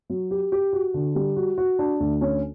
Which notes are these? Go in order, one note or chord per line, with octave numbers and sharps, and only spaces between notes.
F#3
G4
G4
F#4
D3
G3
F#4
F#4
D4
D2
C#4